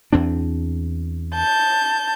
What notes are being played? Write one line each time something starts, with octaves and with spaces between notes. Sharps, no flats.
E2 C4 D4
A5 G6